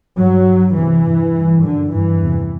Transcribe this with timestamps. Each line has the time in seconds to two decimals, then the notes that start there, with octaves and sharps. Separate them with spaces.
0.18 G2 F#3
0.47 G2
0.76 E2 C3 E3
1.05 G2
1.34 G2
1.63 F#2 D3
1.92 G2 E3
2.21 E2 C3